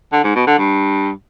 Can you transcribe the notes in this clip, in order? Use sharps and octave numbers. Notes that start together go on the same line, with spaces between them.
D3
G#2
B2
D3
G2